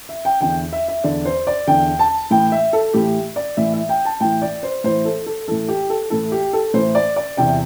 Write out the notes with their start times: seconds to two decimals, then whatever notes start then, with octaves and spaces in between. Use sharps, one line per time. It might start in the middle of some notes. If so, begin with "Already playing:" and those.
0.09 E5
0.25 G5
0.41 E2 D3 G5
0.73 E5
0.88 E5
1.04 E2 D3 D5
1.25 C5
1.47 D5
1.67 E2 D3 G5
1.99 A5
2.31 A2 E3 G5
2.52 E5
2.73 A4
2.94 A2 E3 G4
3.36 D5
3.57 A2 E3 E5
3.74 E5
3.89 G5
4.05 A5
4.20 A2 E3 G5
4.42 D5
4.63 C5
4.84 A2 E3 C5
5.05 A4
5.26 A4
5.48 A2 E3 A4
5.69 G4
5.90 A4
6.10 A2 E3 A4
6.32 G4
6.53 A4
6.74 A2 E3 C5
6.95 D5
7.16 D5
7.37 E2 C3 E3 G5